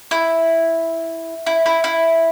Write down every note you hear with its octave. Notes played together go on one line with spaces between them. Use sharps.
E4
E4
E4
E4